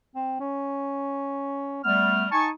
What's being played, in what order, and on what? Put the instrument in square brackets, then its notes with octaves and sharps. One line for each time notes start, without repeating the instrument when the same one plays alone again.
[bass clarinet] C4
C#4
[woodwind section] G3 A3 F6 [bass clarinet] B3
[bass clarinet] D#4 [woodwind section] G#5 A5 C#6